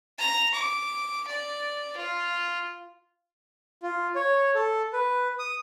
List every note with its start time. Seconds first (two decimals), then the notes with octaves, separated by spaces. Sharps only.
0.18 A#5
0.54 D6
1.27 D5
1.97 F4
3.83 F4
4.15 C#5
4.55 A4
4.93 B4
5.39 D#6